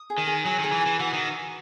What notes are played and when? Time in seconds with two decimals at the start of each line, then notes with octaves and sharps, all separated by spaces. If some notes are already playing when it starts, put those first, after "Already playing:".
Already playing: D#6
0.10 G#4
0.18 D#3
0.27 G#4
0.45 F#3 G#5
0.59 D#3 G#4
0.72 E3
0.81 G#5
0.86 E3
0.99 E3 F#4
1.13 D#3